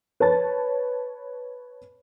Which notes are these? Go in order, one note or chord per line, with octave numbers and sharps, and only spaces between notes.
B4 C#5 A5 A6